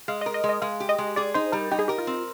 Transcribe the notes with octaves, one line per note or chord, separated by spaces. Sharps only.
G#3 F5
D#5
A#4
D#5
G#3
D#5
G#3 F5
G4
D#5
G#3
G#4 D5
D#4 C5
G3 A#4
D#4 G4
G#4
G4 A#4
F4
C4